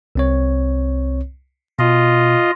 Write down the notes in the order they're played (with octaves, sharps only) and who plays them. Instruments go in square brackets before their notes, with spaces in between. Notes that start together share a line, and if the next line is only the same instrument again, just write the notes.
[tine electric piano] C2 C4 C#5
[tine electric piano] B2 [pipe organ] F4 D#5